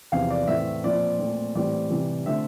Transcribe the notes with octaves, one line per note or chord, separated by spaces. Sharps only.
E2 C3 F3 C4 F5
D5
A2 E3 A3 C4 E5
A#2 F3 C4 D5
A#2 A3 C4
A2 E3 G3 C4 D5
C3 E3 G3
D3 A3 C4 E5